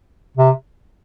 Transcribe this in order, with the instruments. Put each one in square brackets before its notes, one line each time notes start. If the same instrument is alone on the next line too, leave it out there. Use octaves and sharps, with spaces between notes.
[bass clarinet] C3